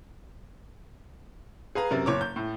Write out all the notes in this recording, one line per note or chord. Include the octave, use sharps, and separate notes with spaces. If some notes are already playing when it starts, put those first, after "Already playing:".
G#4 B4 F5 A#5
F#2 C3 A#4 A6
F#1 C#5 D6
G6
A2